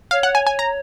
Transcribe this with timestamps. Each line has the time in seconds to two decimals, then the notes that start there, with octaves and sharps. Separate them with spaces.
0.11 C#5 F5
0.23 F#5
0.35 G#5
0.47 G#5
0.59 A#5